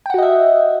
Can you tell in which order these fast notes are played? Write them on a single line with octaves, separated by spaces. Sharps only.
G5 F#5 F#4 D#5 E5